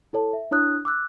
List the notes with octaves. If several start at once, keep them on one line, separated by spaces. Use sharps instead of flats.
E4 A4 C#5 A5
E5
D4 E4 C#5 D#6 F#6
D6 E6 F#6